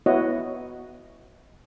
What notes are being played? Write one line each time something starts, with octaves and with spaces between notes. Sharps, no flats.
B3 E4 F#4 C#5 D#5 F#5